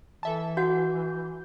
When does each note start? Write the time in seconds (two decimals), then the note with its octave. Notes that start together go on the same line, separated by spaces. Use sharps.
0.23 E3 A4 E5 A5
0.57 F#4 F#5 G6